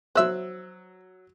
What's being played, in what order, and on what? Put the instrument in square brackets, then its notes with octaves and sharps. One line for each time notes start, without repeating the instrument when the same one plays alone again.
[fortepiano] F#3 E6 F#6 [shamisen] C5 E5